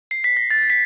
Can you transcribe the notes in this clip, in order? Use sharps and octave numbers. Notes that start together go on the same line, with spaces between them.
C7
B6
A#6
A6
B6